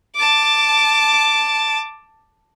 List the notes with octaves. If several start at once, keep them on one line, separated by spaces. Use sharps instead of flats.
A5 D6